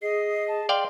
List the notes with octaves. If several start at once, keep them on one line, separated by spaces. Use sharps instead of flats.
G#4 D#5 C7
A5
D5 F5 G5 C6